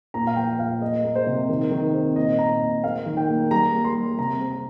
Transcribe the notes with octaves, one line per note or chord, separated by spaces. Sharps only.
A#2 A#5
F5
F3 G5
A#2 F5
A#3 D#5
A#3
C5
C3
D#3
D#3
C4
A#2 D#5
A#2 A#5
A#2
A#3 F5
D#3
G5
A#3
G3 A#5
A#3
C6
G3
C3 A#5
C4
A#5